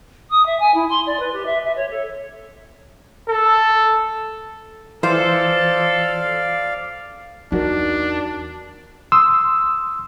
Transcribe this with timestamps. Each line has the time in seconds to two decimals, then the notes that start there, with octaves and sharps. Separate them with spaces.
0.30 D#6
0.46 E5
0.59 G#5
0.74 E4
0.89 C6
1.06 D5
1.19 B4
1.33 G4
1.46 E5
1.64 E5
1.76 C#5
1.90 A4
3.29 A4
5.03 E3 F4 A4 C5 D5 F5
7.52 E2 D4 D#4 F#4 A#4
9.12 C6 D#6 E6